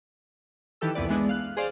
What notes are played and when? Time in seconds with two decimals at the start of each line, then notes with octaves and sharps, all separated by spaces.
0.81 D#3 E3 G4 A4 E6
0.95 C2 F2 E3 B3 B4 D5
1.09 E3 G#3 B3 D4 E4
1.29 F5 F#6
1.57 G#4 C5 D5 F5